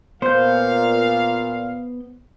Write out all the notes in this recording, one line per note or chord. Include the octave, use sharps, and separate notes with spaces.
A#2 B3 C5 F5 G6